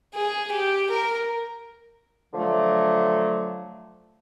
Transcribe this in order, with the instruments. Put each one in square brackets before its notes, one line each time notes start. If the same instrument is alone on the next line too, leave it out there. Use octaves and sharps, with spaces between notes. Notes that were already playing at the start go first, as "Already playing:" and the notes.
[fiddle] G#4
G4
A#4
[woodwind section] D3 F3 F#3 A3